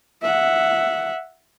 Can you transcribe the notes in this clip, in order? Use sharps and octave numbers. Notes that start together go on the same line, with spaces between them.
E5 F#5